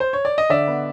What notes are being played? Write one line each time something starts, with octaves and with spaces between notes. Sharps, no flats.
C5
C#5
D5
D#5
D3 D5 E5
B3